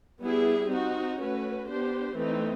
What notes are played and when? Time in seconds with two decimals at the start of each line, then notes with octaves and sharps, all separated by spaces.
0.22 G3 B3 E4 G#4
0.70 C4 D#4 F#4
1.19 A3 C#4 F#4 B4
1.68 B3 D4 G4 C5
2.16 E3 A3 C4 D#4